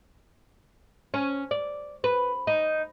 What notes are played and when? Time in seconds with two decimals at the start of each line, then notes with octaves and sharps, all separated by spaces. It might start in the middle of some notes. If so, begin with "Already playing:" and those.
1.14 C#4
1.51 D5
2.04 B4
2.47 D#4